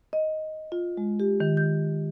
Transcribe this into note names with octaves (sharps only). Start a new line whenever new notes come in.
D#5
F4
G#3
G4
D#3
G6